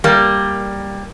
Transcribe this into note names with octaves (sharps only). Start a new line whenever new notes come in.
G3 A#3